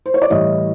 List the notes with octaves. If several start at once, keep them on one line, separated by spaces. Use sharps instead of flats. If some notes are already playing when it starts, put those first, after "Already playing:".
C5
C#5
D5
A2 E3 G3 C#5 D#5